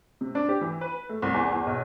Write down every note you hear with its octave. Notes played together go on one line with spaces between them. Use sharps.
C3
D4
G4
E3
B4
A3
C2
E2
E2
B1